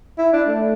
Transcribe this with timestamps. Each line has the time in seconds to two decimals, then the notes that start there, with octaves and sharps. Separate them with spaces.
0.18 E4
0.33 D4
0.48 A3